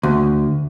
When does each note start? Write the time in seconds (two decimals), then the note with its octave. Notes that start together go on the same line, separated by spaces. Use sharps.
0.03 D2